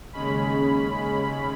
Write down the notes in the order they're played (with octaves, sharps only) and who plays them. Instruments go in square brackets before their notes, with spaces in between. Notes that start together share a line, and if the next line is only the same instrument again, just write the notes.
[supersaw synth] D#2 C#3 G#3 C#4 B5